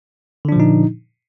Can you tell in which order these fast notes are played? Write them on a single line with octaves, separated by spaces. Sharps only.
D3 D4 F3 A#2 D#4